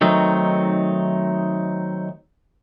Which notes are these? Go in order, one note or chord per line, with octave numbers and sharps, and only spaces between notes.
D#3 F#3 A3 C4 D#4